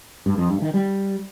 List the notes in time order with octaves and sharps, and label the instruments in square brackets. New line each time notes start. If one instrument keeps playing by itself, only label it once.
[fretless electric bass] G2
F2
G2
D#3
G3